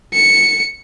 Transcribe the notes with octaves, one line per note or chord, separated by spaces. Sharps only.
C#7